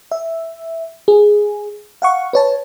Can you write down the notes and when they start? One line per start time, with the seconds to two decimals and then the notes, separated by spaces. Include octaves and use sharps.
0.12 E5
1.08 G#4
2.02 F5 F#5 C#6
2.33 B4 C#5 A5